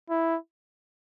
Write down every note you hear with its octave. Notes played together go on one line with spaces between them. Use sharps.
E4